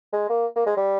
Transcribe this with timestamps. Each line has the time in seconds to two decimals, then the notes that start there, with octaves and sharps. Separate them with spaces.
0.13 G#3
0.29 A#3
0.56 A#3
0.66 G#3
0.77 G3